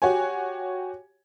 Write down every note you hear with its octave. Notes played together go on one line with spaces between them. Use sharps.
F#4 G4 C#5 G#5